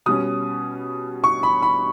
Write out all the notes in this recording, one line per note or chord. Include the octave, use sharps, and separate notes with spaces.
B2 G3 C#4 D#6
C#6
B5
B5